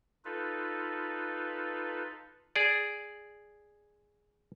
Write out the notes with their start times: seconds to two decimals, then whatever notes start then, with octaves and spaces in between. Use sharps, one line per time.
0.25 D#4 F4 A4 B4
2.56 G#4 D5